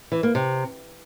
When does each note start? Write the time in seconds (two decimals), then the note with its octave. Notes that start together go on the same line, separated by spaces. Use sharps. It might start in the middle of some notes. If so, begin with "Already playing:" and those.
0.12 E3
0.23 A#3
0.35 C3